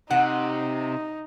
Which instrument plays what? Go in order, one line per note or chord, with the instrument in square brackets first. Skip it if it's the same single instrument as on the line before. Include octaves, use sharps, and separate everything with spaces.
[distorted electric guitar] C3 [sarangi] D#4 [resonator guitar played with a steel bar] F#5